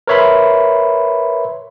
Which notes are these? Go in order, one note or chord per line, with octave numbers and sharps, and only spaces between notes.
A#4 B4 C#5 E5 B5 C6